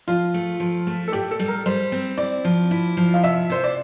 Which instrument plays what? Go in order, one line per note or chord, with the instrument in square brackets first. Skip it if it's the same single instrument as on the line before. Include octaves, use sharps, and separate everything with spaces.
[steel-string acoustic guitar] F3 [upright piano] F4
[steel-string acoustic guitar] A3
F3
A3
[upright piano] A4
[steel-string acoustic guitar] A2 [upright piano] G4
[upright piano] A4
[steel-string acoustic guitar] G3
[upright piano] A#4
[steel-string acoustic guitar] G3 [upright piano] C5
[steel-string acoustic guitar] C4
[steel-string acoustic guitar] E4 [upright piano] D5
[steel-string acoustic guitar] F3
E4
F3
[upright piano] F5
[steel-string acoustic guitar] C3 [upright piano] E5
[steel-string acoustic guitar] C3 [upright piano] C5
[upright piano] D5